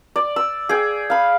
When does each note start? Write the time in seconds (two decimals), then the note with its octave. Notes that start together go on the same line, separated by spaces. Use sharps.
0.16 D5
0.36 E6
0.69 G#4 G5
1.10 F5 B5